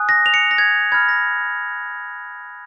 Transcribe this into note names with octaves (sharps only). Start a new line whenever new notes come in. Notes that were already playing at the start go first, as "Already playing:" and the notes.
Already playing: G#5 D#6 F#6
A#6
F7
C#7
A#6
G#6
B5 F6 G#6
A#6